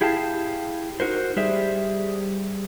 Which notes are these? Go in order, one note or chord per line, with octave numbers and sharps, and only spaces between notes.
E4 G4 G#4 F5 G5 A5
D#4 F#4 A#4 C5
G3 G4 G#4 C5 D5 E5